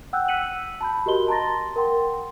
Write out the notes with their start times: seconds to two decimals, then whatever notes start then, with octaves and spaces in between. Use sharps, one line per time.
0.13 F#5 G5 E6 F#6 G6
0.28 E6 F#6 B6 C#7 D#7 F#7
0.81 A5 B5 G6
1.06 F#4 G4 A#4 D#5 C6 G7
1.28 A5 A#5 C6 A6 A#6
1.76 A#4 F#5 G5 C6